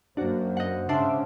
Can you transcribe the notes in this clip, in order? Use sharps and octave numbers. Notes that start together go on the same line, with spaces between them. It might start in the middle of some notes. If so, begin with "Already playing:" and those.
F#2 A#3 D4 F#4 C5
D#5 F#5
G#2 C#3 D4 C5 E5 C6 D6